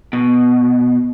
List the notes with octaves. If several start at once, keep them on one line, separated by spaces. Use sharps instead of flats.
B2